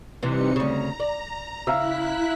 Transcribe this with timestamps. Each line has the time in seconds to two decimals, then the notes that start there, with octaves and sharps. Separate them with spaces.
0.23 C3 E3 G3 D#4 C#7
0.56 D2 C#3 A#5
1.00 D5
1.67 C#3 E4 E5 F5 A#5 F#6 B6